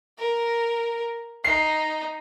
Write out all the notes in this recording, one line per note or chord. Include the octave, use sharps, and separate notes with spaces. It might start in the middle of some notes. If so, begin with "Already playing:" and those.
A#4
D#4 C7